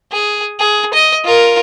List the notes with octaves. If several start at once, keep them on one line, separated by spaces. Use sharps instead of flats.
G#4
G#4
D#5
F4 A#4